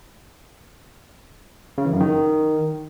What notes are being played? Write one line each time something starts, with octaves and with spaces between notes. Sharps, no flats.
C#3
E3
F#2
D#3